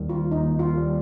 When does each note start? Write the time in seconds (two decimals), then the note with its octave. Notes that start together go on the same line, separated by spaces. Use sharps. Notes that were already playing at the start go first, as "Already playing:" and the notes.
Already playing: D#2 D#3 G3
0.09 F4
0.31 D#2 D#4
0.59 F4
0.74 D#3 G3